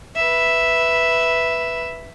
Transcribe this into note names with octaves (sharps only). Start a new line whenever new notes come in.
B4 E5